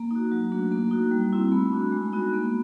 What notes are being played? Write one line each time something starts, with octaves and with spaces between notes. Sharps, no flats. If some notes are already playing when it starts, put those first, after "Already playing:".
Already playing: A#3 A#5
D#4 F#4
F#3
A3 D4 F#4
A#3 A#5
D#4 F#4
G3
C4 E4
A3 B5
D4 F#4
G#3
B3 D#4 F#4
A#3